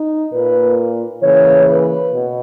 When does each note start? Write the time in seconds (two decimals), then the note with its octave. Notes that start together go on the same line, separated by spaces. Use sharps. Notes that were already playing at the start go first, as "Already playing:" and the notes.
Already playing: D#4
0.33 A#2 A#3 B4
1.23 C#3 E3 A#3 C#5
1.68 B4
2.12 B2